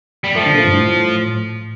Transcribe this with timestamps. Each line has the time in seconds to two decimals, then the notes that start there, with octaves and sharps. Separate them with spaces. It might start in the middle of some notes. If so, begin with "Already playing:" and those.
0.24 G3
0.35 F3 A3
0.45 D3
0.54 A#2
0.64 G2
0.73 A2